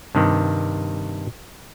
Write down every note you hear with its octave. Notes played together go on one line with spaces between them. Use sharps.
G2 C3 D#3